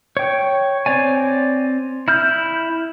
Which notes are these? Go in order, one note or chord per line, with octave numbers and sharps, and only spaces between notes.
C#5 G5
C4 C#5 D5 G#5
E4 F6 G6